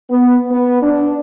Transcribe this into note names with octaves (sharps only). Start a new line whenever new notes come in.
B3
B3
D4